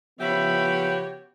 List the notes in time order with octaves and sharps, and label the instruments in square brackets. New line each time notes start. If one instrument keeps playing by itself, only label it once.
[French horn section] C#3 F3 B3 [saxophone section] F#4 G4 C#5 [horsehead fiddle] E5 B5